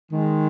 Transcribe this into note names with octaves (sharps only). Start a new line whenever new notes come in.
D#3 G#3